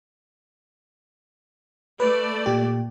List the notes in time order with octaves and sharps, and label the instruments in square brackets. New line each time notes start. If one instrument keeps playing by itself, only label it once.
[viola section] A3 D5 [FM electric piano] B4
[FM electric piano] A#2 G4